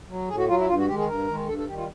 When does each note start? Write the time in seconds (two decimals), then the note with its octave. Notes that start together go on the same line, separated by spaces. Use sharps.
0.09 F#3
0.29 A2 G#4
0.38 F#4
0.48 F#3 F4
0.59 E4
0.68 G2 F4
0.78 F#4
0.88 D#3 G#3 G4
0.98 G#4
1.07 G2 A#4
1.28 D#3 G#3
1.47 G2 A4
1.58 A4
1.68 D#3 G3 G4
1.77 F4